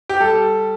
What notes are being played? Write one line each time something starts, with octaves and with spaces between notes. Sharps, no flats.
G4
G3 A4